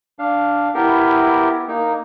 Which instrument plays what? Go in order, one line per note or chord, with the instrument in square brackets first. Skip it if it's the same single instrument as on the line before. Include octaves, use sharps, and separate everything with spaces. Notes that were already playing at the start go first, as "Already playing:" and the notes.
[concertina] D4 F5
[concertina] B3 G4 A#4 [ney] E4
[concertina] A#3 D#4